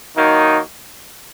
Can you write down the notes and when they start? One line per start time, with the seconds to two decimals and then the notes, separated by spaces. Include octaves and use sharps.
0.16 D#3 F#3 A#3 D#4